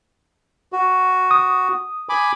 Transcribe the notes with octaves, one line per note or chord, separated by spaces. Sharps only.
F#4
D#6
G#5 B5 D6